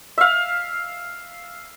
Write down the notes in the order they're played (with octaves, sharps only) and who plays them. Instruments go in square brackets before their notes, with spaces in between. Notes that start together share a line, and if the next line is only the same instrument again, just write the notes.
[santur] E5 F5